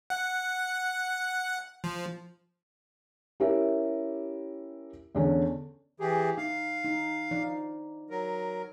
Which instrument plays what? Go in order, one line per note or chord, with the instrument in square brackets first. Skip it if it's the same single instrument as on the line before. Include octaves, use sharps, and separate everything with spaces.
[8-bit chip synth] F#5
F3
[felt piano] C#4 E4 G4 A#4 E5
E2 D3 C#4
[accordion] E3 G4 G#4
[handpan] D#4 [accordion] F5
[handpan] D#4
F3 D#4 D5
[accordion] F#3 A#4